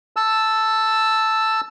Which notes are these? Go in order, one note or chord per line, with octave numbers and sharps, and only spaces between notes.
A5 E6